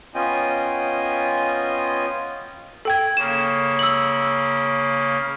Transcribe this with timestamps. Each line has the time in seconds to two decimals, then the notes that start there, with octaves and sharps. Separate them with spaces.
0.15 B3 C#4 F4 D#5 G5 G#5
2.85 A4 G5 G#6
3.17 C#3 A#3 C#4 E7
3.79 E6 F#7